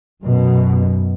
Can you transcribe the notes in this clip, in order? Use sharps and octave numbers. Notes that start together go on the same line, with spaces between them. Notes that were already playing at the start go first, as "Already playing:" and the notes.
F#2 B2